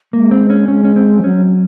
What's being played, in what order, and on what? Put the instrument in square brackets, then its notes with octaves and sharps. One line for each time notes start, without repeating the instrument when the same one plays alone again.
[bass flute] G#3 [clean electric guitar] A#3
[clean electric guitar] C4
C#4
[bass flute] G#3 [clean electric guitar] C#4
[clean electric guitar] C#4
C4
[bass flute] F3
[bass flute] F#3 [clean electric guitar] C#4